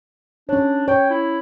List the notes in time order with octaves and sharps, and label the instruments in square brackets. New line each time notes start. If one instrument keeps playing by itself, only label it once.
[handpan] C#4 C#5 [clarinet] D4
[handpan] C#5 [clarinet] G5
[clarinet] E4